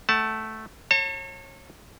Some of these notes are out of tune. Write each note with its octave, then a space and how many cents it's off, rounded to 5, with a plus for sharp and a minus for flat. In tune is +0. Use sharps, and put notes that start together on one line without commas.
A3 -5 F#5 +30 A5 +0
C#5 -30 A5 +40